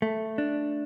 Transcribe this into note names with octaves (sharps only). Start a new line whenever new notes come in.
A3
D4